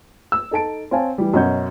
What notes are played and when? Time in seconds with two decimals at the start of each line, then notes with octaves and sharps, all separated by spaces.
0.32 E6
0.51 D#4 A4 A5 D7
0.91 C4 C#5 F5 G#5 A5
1.18 E3 G3
1.34 F#2 B2 C#4 D#5 F#5 G6